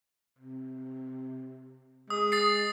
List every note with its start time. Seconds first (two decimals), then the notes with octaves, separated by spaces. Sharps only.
0.39 C3
2.10 G#3 D#6
2.32 D#6 A6 C7